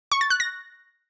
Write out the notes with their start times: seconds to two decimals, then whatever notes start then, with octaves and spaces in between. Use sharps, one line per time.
0.12 C#6
0.21 A6
0.30 F#6
0.40 A#6